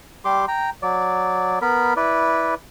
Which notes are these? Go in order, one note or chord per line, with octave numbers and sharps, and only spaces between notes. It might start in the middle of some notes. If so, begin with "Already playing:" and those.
G3 G4 C6 D6
G5 A#5
F#3 D5
B3 A#4 B5
E4 B4 D5